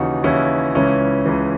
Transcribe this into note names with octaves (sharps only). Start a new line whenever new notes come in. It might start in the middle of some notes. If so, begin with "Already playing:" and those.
Already playing: D#2 C#3 E3 D#4 F#4
D#2 C#3 E3 C#4 E4
C#2 C#3 E3 C#4 E4
C#2 C#3 E3